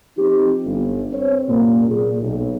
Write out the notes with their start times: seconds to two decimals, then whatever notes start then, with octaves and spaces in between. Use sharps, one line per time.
0.17 F3 C4 D#4 G4
0.65 G1
1.12 C4 C5 C#5
1.48 C2 F#2 A#2 A#3
1.89 A#2 G#4
2.21 B1